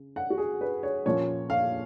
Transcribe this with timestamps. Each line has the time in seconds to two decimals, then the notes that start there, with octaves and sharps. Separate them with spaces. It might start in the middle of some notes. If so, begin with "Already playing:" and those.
Already playing: C#3
0.16 F#5
0.30 F#4
0.38 G#4
0.61 B4
0.83 C#5
1.06 A#2 F3 A#3 C#4 C#5
1.50 F5